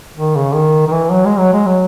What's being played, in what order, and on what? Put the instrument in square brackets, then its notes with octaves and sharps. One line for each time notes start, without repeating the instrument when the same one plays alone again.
[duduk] D#3
C#3
D#3
D#3
E3
F#3
G#3
F#3
G#3
F#3